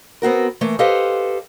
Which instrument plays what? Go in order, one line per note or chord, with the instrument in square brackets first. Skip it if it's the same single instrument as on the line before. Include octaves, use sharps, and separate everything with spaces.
[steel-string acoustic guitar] B3 C4 F#4 A#4
E3 A3 A#3
G4 A4 B4 C5 D#5 F5